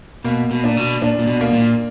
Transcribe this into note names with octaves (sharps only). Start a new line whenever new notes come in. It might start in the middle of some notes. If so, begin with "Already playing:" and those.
B2 A#3
B2
A#2 D4
B2
A#2 D4
A#2
B2
A#3
A#2